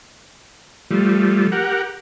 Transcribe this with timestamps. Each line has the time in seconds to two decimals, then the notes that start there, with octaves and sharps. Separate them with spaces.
0.91 F3 G3 A3
1.52 G4 A#4 F#5